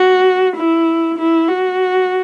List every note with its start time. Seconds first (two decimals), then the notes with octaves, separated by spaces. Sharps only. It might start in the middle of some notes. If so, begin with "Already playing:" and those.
Already playing: F#4
0.57 E4
1.18 E4
1.49 F#4